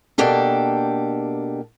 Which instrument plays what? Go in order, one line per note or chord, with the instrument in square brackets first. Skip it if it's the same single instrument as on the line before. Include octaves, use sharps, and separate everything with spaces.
[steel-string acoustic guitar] B2 A#3 D4 G4 A4